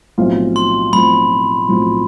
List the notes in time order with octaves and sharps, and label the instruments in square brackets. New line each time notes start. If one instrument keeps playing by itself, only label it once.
[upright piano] B1 A2 F3 C4 F4
[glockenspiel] C6
[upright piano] B1 A2 F3 C4 F4 [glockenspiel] B5
[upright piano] B1 A2 F3 C4 F4